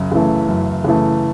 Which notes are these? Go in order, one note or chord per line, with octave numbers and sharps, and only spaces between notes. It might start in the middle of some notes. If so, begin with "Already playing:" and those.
Already playing: F#2 C#3
C#3 E3 A3
F#2
C#3 E3 A3